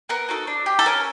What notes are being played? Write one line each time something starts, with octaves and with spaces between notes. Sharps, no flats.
B3 A#4
D#4 F#4 A4
D4
G4
A4
C#4 A#4